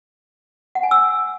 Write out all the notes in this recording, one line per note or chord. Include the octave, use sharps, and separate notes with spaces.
F#5
G#5
E6